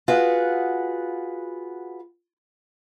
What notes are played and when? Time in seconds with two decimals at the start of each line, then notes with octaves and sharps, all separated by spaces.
0.08 F4 F#4 G#4 B4 F#5